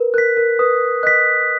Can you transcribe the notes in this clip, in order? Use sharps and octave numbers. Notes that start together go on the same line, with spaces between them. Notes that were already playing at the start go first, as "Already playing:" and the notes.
Already playing: A#4 B4
A#4 F#6 B6
A#4
B4 D#6
D#5 F#6 B6